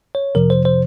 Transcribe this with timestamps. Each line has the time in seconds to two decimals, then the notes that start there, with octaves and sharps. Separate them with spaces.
0.15 C#5
0.35 F2 C3 F3 A#4
0.50 C5
0.65 C5